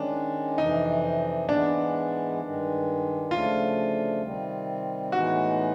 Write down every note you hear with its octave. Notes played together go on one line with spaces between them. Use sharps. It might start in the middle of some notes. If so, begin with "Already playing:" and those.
Already playing: D#3 G#3 C#4 D4
F2 C3 E3 D#4
G#2 E3 G#3 B3 D4
G2 D#3 G#3
D2 C#3 F3 A3 D4 F4
C3 D#3 G3 C4
A2 E3 G#3 B3 D#4 F#4